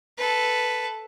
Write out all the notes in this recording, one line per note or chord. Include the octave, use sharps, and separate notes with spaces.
A4 B4